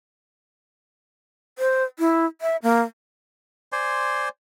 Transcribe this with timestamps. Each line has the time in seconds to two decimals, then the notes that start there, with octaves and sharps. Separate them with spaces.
1.59 C5
1.99 E4
2.41 E5
2.63 A#3
3.72 C5 D5 G#5 C6